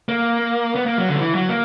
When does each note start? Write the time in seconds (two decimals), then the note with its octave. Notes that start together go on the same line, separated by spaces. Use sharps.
0.09 A#3
0.75 B3
0.86 A#3
0.98 F#3
1.09 D3
1.15 F#3
1.19 E3
1.35 F#3
1.49 A#3